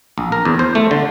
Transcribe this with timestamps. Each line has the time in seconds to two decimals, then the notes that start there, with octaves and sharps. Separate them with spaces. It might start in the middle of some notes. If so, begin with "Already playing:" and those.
0.18 A#1
0.32 A#4
0.45 E2
0.59 C5
0.75 A3
0.91 D3